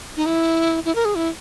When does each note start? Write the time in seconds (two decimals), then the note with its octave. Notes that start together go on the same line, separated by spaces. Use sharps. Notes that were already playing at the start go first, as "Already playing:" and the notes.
0.17 D#4
0.26 E4
0.85 E4
0.95 A#4
1.05 G#4
1.15 E4